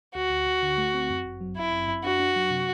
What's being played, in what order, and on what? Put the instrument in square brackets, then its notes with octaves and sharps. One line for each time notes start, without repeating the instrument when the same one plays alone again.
[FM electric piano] D2 [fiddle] F#4
[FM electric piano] D2
D2
D3
A3
C4
F#2
G1
F#3
[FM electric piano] G1 [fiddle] E4
[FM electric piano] F#2
F#2
[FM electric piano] D4 [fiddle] F#4
[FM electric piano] D4
F#3
C3